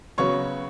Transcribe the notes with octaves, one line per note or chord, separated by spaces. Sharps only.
C#3 F#3 B3 C#5 C#6